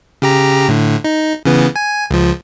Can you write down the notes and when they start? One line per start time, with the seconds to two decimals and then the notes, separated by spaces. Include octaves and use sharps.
0.22 C#3 G4 A#5
0.68 A2 D3
1.04 D#4
1.45 C#3 E3 B3
1.76 G#5
2.11 C#2 F3